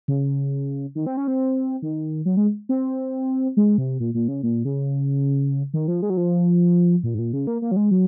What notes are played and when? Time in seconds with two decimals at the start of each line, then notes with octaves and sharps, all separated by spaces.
0.08 C#3
0.95 D#3
1.06 C4
1.17 C#4
1.28 C4
1.82 D#3
2.25 F#3
2.37 G#3
2.69 C4
3.57 G#3
3.78 C3
4.00 A#2
4.14 A#2
4.28 C#3
4.43 A#2
4.65 C#3
5.74 D#3
5.88 F3
6.02 G#3
6.10 F#3
6.17 F3
7.04 A#2
7.14 G#2
7.19 A#2
7.33 C#3
7.47 A#3
7.62 A#3
7.71 F#3
7.76 G#3
7.91 F#3